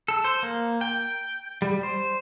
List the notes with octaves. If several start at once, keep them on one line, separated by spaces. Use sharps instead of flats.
A4
C5
A#3
G5
G3
C5